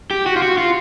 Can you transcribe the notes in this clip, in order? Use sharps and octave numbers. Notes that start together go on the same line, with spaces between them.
G4
F#4
F4
F#4
F4